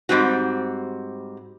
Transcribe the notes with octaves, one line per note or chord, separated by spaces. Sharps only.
G#2 D3 G3 C4 F#4